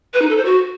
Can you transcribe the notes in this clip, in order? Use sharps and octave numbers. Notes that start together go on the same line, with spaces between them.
B4
D#4
A4
C5
F#4